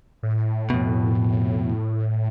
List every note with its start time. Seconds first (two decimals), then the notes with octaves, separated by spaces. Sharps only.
0.23 A2
0.70 F2 B2